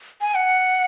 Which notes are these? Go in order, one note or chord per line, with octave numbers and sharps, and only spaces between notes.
G#5
F#5